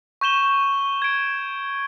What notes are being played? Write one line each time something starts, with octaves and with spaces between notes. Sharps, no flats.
C#6 G6 E7 G7
G#6 D7